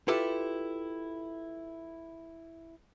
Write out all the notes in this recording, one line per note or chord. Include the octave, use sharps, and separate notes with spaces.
E4 F4 G4 A4 B4